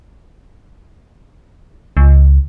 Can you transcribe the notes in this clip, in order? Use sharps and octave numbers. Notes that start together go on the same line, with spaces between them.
C#2